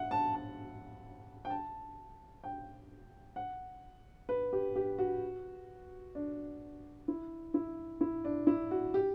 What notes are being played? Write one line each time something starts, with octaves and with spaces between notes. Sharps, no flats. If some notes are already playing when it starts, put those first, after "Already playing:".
Already playing: E5 F#5
A5
A5
G5
A5
G5
F#5
B4
G4
G4
F#4
D4
E4
E4
E4
D4
E4
F#4
G4